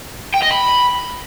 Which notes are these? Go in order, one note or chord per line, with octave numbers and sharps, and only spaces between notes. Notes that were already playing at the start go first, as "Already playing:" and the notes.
G5
D#5
B5